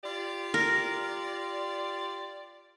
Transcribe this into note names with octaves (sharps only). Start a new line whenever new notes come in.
F4 G4 D5
A#4